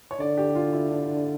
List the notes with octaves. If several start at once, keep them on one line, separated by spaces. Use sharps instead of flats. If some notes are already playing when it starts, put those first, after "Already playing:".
C#5
D3 D5
G4
F4
E4
D4
E4